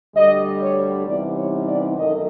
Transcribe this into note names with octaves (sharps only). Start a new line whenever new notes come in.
D2 D3 G3 D#5
C#5
C3 E3 G3 B3 D#4 D5
C#5
D5
F#2 D#3 F#3 A3 D#5